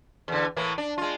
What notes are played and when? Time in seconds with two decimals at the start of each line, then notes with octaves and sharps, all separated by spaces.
0.28 E2 D3
0.56 A2 E3 A#3
0.78 D4
0.98 G#3 F4